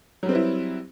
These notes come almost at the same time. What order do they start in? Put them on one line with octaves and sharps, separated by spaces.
F#3 G3 C4 B4 E4